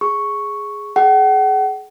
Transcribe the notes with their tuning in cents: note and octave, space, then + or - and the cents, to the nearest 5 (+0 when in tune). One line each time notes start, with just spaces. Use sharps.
G#4 +0 C#6 +0
G#4 +25 F#5 +40